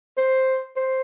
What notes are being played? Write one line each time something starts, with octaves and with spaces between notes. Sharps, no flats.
C5
C5